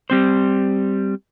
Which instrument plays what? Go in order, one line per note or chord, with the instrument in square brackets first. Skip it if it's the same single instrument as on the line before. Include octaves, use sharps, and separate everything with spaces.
[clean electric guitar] G3 C4 C5